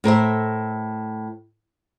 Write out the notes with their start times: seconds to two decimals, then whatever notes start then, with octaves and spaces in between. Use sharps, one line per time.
0.04 A2 A#4 C5 E5